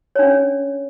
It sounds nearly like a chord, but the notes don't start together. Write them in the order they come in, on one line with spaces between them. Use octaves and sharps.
C#5 D4 C#4